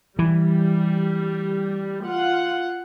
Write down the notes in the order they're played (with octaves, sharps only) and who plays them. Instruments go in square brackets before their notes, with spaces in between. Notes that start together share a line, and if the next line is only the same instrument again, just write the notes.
[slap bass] E3 [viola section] G3
[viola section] F4 F#5